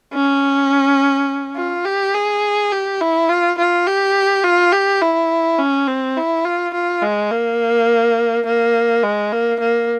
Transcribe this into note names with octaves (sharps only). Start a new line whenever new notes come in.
C#4
F4
G4
G#4
G4
E4
F4
F4
G4
F4
G4
E4
C#4
C4
E4
F4
F4
G#3
A#3
A#3
G#3
A#3
A#3